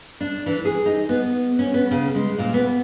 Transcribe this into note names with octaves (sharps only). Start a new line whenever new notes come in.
D4
E3
G#4
D#4
B3
C#4
B3
C#3
G#3
A#2
B3